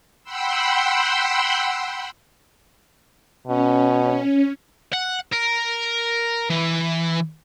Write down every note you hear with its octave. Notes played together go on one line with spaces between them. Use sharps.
F#5 G5 B5 C6 E6
B2 C#4
F#5
A#4
E3